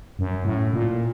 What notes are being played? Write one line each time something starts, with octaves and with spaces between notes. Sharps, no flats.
F#2
A2
A#2